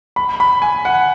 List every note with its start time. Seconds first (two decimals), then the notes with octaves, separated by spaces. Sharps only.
0.16 B5
0.40 B5
0.62 G#5
0.85 F#5